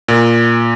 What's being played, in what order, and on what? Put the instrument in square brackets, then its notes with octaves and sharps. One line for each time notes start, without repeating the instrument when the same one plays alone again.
[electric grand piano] A#2